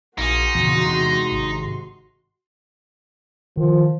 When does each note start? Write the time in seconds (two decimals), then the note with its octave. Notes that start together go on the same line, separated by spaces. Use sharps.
0.18 A#1 A#3 D#4 F#4 G#4 C6
0.55 E2 A#2 C#3
0.86 C3 G#3
1.32 G#1
3.57 D#3 F3